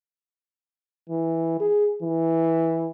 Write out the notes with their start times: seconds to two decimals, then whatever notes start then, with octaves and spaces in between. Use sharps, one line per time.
1.09 E3
1.60 G#4
2.03 E3